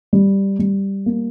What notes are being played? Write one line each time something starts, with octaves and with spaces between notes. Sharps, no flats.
G3
G3
A#3